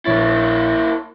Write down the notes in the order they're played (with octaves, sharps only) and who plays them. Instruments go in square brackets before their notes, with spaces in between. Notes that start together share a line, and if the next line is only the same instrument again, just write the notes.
[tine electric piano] A#1 C#5 A6 [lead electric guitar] A#3 E4